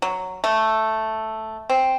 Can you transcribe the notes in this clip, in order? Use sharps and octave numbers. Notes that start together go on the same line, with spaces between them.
F#3
A3
C4